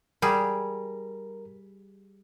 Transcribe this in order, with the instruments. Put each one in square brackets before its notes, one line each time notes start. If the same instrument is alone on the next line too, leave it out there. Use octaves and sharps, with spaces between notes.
[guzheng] G3 G#4 [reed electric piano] A#4